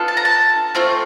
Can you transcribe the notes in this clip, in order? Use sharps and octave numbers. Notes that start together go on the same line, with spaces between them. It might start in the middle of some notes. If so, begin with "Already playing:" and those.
Already playing: B3 D4 F4 A4
A5
A#5
A5
A3 C4 F4